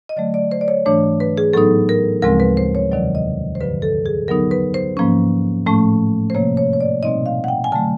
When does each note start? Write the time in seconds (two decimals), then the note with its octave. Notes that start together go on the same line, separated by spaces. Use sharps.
0.09 D#5
0.16 D3 F#3 A3 D5
0.34 D5
0.51 C5
0.61 D5
0.68 C#5
0.86 G#2 E3 A3 D4 C#5
1.20 B4
1.37 G#4
1.53 A2 F#3 B3 D#4 A4
1.89 A#4
2.22 D2 C#3 F3 G#3 C4 A#4
2.40 B4
2.57 C5
2.75 C#5
2.92 E2 C3 D#3 F#3 D5
3.15 D#5
3.55 C5
3.61 G2 D3 F3 B4
3.82 A4
4.06 G#4
4.28 D3 F#3 B3 D#4 A#4
4.51 B4
4.74 C5
4.97 G#2 F3 A#3 C#4
5.66 A2 F3 A3 C#4
6.30 C5
6.35 C3 F3 A#3 C#5
6.57 C#5
6.73 C#5
6.81 D5
7.03 B2 G3 C4 D#4 D#5
7.26 F5
7.44 F#5
7.48 G5
7.64 G#5
7.72 D3 F#3 A3 A5